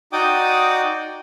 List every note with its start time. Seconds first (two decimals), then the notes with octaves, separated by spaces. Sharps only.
0.13 D#4 F#4 D5 G5 D6 D#6